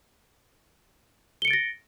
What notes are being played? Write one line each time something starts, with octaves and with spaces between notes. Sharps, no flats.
A6 A#6 C#7 D7 G7